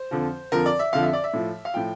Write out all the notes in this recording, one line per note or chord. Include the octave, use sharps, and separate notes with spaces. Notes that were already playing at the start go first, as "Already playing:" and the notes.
Already playing: C5
F2 D3 F3
F2 D3 F3 A#4
D5
E5
F2 D3 F3 F5
E5
D5
E5
A2 F3
F5
A2 F3 G5